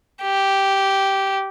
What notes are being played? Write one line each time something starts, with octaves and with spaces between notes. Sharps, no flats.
G4